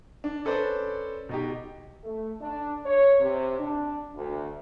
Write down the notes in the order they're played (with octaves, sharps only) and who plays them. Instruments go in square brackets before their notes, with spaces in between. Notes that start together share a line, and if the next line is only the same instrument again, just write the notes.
[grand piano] D4
C#4 A4 B4 C5 D5
B2 D#4 G4
[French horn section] A3
D4
C#5
C3
D4
D2